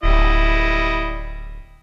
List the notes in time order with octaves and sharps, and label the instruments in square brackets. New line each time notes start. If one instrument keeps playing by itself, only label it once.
[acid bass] D1 [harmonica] G3 E4 D#5